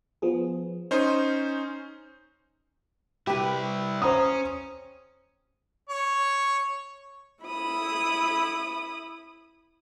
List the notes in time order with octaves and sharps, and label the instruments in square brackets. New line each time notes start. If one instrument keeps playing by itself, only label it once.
[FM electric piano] F3 B3 G#4
[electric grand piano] C#4 D#4 C5 [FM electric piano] D#5 C#6 D#6
[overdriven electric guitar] C2 E4 [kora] G4 B4
[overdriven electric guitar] C#4 [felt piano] C5 A#5 D#6
[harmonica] C#5
[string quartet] E4 B5 D#6